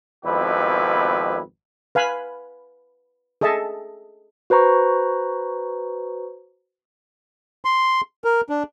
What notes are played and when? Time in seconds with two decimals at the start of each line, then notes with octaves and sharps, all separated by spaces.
0.25 G#1 F2 B2 E4 G4 B4
1.95 B4 F5 G#5 B5
3.41 G#4 A4 D#5 E5 A5
4.50 F#4 B4 C5 A#5 C#6
7.65 C6
8.24 A#4
8.49 D4